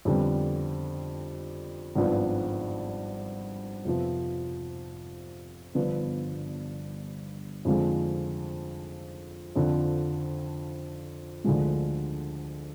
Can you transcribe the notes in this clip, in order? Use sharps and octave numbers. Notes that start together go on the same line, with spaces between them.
F2 D3 G3 B3
G#1 G2 F3 B3
F2 C3 F3 B3
G1 G2 F3 B3
F2 D3 F3 G#3
F2 D3 F3
D2 D3 F3 G#3